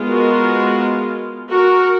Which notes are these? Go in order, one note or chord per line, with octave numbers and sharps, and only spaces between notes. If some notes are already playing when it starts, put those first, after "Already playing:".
Already playing: G#3 B3 F4
F#4 A#4
F#4 A#4